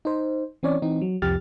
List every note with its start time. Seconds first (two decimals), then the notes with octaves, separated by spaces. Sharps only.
0.05 D#4 C5
0.63 E3 C4 C#4 C#5 D5
0.82 E3 C4 D#4
1.02 F#3
1.22 C2 F2 F3 G4 F6 A6